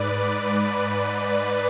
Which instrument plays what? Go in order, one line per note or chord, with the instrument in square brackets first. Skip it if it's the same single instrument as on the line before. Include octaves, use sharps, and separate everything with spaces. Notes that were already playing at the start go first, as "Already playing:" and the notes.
Already playing: [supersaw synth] G#2 B4 D5